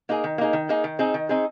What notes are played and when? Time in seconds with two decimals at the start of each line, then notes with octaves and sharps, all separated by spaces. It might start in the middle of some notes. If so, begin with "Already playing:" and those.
0.09 A#3 D#4 G#4
0.24 D#3
0.38 A#3 D#4 G#4
0.53 D#3
0.69 A#3 D#4 G#4
0.84 D#3
0.99 C4 D#4 G#4
1.14 D#3
1.29 C4 D#4 G#4